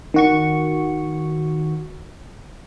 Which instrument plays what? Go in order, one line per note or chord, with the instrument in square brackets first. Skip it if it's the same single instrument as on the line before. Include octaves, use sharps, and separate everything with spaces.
[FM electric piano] D#3 F#4 C#6